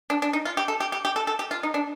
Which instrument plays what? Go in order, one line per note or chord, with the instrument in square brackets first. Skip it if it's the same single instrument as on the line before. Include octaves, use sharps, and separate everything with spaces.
[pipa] D4
D4
D#4
F4
G4
A4
G4
G4
G4
A4
A4
G4
F4
D#4
D4